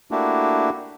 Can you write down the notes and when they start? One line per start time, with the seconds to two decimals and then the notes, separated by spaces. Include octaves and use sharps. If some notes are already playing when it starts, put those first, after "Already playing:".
0.11 A3 A#3 D4 E4 F#4 G4